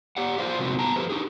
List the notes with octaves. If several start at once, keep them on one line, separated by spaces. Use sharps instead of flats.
G4 D5 F#5
F4 F#4 G#4 C5 D5 F5
A2 C3 F3 G#3 C4 F#4
B3 G5 A5 A#5
F3 A3 E4 G4 B4 C5
D4 G4 G#4